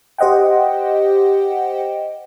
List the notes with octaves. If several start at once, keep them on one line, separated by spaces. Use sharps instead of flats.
G4 C5 D#5 F#5 G5